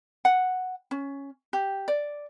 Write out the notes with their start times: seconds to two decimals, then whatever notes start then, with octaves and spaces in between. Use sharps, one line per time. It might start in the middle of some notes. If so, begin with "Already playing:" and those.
0.25 F#5
0.91 C#4
1.53 G4
1.88 D5